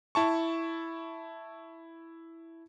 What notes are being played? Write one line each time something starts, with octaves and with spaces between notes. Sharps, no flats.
E4 A5 C#6